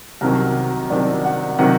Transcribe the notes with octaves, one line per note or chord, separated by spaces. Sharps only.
C2 C3 D#3 F#3 A#4
C2 C3 D#3 F#3 D5
F#5
C3 D#3 F#3 F#5